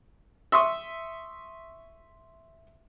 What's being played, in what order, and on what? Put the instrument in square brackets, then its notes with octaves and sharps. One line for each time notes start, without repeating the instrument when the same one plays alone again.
[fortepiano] E5 C6 C#6 D#6